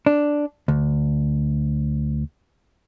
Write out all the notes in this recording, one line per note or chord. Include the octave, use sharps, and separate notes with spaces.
D4
D2